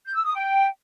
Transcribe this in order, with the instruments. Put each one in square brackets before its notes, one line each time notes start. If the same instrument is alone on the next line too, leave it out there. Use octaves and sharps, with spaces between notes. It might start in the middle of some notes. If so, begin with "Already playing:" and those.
[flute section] G6
E6
D#6
G5